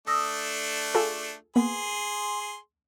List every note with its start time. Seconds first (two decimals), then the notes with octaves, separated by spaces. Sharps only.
0.07 A3 D4 D#6 E6 A#6
0.95 F4 G#4 A4
1.56 A#3 B3 G#4 C6